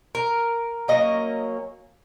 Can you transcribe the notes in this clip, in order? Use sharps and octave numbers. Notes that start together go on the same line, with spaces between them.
A#4
F#3 A#3 C#4 D#5